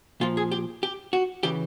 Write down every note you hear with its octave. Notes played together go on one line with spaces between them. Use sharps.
A#2 F3 F4
G#4
G4
G4
F#4
C#3 E3 G4